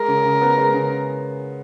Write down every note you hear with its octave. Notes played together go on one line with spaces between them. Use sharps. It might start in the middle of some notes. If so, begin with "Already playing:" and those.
Already playing: G#3 A#4
C#3
C#3
B3
G#3
C#3